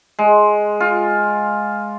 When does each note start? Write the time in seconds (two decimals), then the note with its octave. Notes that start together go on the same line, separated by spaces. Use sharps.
0.19 G#3
0.80 F4